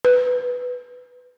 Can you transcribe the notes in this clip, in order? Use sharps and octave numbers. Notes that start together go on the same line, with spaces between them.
B4